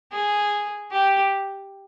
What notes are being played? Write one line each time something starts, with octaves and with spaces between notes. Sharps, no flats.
G#4
G4